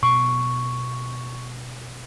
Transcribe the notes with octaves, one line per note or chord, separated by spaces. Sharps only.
B2 C#6